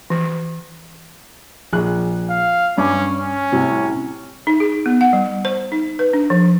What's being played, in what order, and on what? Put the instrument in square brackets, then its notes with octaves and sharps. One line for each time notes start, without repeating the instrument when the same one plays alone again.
[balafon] E3
[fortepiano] A#1 G#4 F#6
[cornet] F5
[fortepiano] G2 D4 D6 [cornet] C#4
[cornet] C#4
[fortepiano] A2 C3 G3
[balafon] D#4
G#4
B3
F#5
G3
C5
D#4
B4
D4
F3